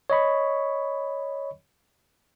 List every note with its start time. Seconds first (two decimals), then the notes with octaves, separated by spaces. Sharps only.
0.10 C#5 D#5 B5 C#6